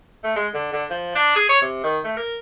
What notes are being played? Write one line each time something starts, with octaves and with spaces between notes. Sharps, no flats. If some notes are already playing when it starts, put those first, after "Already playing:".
A3
G#3
D3
D3
F3
D4
G#4
C#5
C3
D#3
A3
A#4